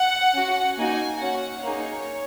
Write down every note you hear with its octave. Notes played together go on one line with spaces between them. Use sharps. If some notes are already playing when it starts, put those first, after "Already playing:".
Already playing: F#5
C#4 F#4
A#3 D#4 F#4 G#5
C#4 F#4 F#5
A#3 D#4 G#4 C#5